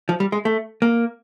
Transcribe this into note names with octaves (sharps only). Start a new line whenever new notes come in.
F3
G3
G#3
A3
A#3